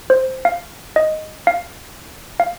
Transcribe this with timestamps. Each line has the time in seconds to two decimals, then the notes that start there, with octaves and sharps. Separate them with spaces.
0.10 C5
0.45 F5
0.96 D#5
1.47 F5
2.40 F5